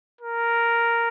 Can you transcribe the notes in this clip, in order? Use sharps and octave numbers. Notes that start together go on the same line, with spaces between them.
A#4